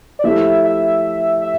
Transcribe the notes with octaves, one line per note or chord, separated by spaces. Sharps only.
D5
F3 A3 E4 G4 E5
E5
E5